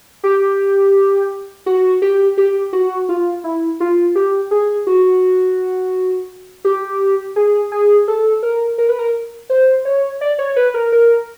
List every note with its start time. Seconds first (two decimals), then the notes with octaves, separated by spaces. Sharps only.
0.24 G4
1.66 F#4
2.02 G4
2.38 G4
2.73 F#4
3.09 F4
3.44 E4
3.80 F4
4.15 G4
4.51 G#4
4.87 F#4
6.65 G4
7.36 G#4
7.72 G#4
8.08 A4
8.43 A#4
8.78 A#4
8.89 B4
8.99 A#4
9.50 C5
9.85 C#5
10.21 D5
10.38 C#5
10.56 B4
10.74 A#4
10.92 A#4